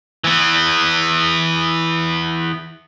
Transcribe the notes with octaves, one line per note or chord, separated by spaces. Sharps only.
E3 B3